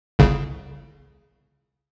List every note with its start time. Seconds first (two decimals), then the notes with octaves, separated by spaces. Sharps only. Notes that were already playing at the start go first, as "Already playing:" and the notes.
0.19 G1 C2 C#3